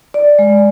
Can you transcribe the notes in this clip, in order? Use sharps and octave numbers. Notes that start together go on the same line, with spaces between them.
D5
G#3